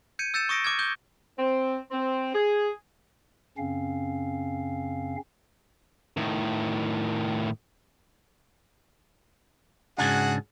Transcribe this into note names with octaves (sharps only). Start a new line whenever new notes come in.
G6 G#6 C#7 D#7
E6 G6 A6 C#7 E7
C#6 D#6 A#6 C#7 D7
D6 F6 G#6
D#6 G6 G7
C4
C4
G#4
F#2 C#3 C4 C#4 F5
A2 D#3
G#2 C#3 D4 F#4 G#4 F#5